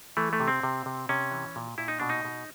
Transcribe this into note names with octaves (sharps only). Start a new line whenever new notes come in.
E3 A3
A3
C3
C4
C3
C3
C3 C#4
E3
A#2
A#2 E4
D#4
B2 D4
D#4
B2